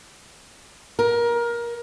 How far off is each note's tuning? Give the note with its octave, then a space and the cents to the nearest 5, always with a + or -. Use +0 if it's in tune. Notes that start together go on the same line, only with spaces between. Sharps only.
A#4 +20